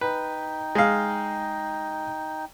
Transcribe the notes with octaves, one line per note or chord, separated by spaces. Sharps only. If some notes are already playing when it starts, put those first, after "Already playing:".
D#4 B4 G5
G#3 F5